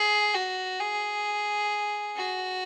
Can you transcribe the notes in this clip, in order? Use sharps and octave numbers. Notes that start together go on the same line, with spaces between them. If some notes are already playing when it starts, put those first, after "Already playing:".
Already playing: G#4
F#4
G#4
F#4